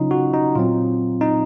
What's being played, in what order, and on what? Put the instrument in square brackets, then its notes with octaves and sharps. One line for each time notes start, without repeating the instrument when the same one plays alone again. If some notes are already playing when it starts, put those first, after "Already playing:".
Already playing: [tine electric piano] C#3 F#3 C#4 D#4 F4
F#4
D#4
A#2 F#3 C4 F4
D#4